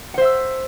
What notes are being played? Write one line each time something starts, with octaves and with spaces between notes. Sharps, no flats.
C5 E5 F#5 E6